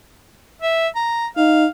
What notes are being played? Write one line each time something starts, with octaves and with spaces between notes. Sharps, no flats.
E5
A#5
D#4 F5